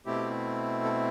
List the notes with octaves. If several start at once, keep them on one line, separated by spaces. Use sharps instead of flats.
B2 A3 C4 E4 G4
A4